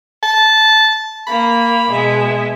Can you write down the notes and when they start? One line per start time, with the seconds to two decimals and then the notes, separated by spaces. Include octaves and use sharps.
0.23 A5
1.27 A#3 B5
1.89 B2 G#3 E5